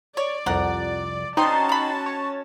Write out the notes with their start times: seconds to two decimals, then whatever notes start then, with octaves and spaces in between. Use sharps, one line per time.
0.17 C#5 D5
0.46 C2 F2 F3 A#4 F#5
1.37 D3 C4 C#4 D#4 F#4 G5 A5 C6
1.69 A#5 B5
2.06 C#5